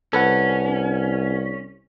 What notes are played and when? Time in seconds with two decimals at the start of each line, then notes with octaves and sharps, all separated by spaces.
0.13 C2 C#4 A4 B4 F#5